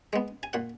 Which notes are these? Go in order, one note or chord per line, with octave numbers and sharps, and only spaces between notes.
G#3 B3
G#5
A#2 F#5